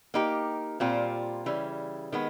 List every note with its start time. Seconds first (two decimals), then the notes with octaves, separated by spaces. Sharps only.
0.14 A#3 D#4 G4
0.80 A#2 G3 C4 F4
1.46 C#3 E3 G3
2.12 D#3 G#3 B3